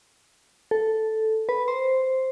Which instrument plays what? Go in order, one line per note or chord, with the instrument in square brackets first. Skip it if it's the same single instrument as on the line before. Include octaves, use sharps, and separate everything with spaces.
[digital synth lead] A4
B4
C5